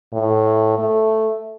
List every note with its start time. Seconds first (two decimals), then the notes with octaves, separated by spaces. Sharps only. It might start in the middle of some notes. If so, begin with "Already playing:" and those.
0.13 A2
0.79 A3